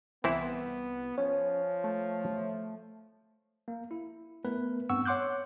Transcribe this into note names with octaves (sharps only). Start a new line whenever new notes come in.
C2 E3 B3 C4 E4
F3 C#4 C#5
A3
A#3
E4
A3 B3 A#4 B4
G2 B3 C4 F#5 C#6 E6
C#5 F#5 C6 D6 F#6 G6